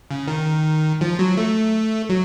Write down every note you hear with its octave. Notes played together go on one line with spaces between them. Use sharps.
C#3
D#3
F3
F#3
A3
F#3